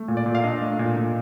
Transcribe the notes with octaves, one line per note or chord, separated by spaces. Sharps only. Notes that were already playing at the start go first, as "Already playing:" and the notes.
Already playing: A3
A#2
D5
A#2
F5
D4 D#5
A3
A#2
A#2